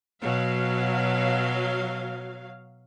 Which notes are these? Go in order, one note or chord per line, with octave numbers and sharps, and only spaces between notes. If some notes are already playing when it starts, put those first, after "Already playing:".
B2 F#3 F5